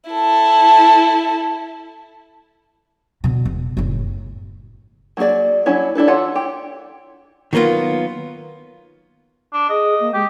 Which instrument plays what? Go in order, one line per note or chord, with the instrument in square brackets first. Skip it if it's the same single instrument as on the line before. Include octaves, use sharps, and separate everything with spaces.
[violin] E4 A4
[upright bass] B2 D3
E1
F#1 A2
[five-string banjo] F#3 A#3 D#4 G#4 D5
F#3 C#4 D4 E4 C#5
D4 E4 A4 B4
E3 F4 A4 C#5 F#5
G4
[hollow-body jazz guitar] D#3 F#3 A#3 B3 F4
[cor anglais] D4
[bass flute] G#4 [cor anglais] D#5
[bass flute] A#3
[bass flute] G#3 [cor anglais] G4